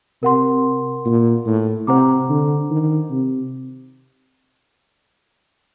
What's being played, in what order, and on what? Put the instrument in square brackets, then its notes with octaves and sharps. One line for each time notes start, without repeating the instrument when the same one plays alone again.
[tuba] C3 [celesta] A#4 F#5 C6
[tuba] A#2
A2
[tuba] C3 [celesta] C5 F#5 A#5 D6
[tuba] D3
D#3
C3